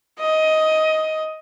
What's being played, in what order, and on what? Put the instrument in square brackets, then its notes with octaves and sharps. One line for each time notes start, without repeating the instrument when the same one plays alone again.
[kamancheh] D#5